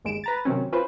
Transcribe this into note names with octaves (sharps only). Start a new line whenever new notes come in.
G1 D#2 G#3 D7 E7
B4 A#5 A6
C3 D#3 F#3 C4 C#4
C#4 F4 B4 C5